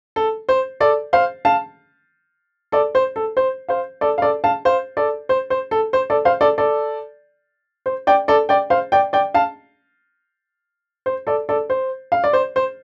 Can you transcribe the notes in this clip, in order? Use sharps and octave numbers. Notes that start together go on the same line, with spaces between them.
A4
C5
A4 D5
C5 F5
F5 A5
A4 D5
C5
A4
C5
C5 F5
A4 D5
F5
A4 D5
F5 A5
C5 F5
A4 D5
C5
C5
A4
C5
A4 D5
C5 F5
A4 D5
A4 D5
C5
D5 G5
A4 D5
D5 G5
C5 F5
D5 G5
D5 G5
F5 A5
C5
A4 D5
A4 D5
C5
F5
D5
C5
C5